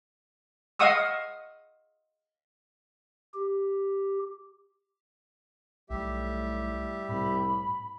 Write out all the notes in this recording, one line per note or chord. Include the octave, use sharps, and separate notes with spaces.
D#5 F5 F#5 C#6 D#6 E6
G4
B1 A2 G3 G4 E5
C2 A2 B5